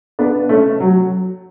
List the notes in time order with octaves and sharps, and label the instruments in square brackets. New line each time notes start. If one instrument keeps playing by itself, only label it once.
[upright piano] B3 D4
A3 C#4
F#3